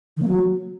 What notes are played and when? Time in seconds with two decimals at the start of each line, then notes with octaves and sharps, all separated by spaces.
0.17 D#3
0.22 A#3
0.28 F#3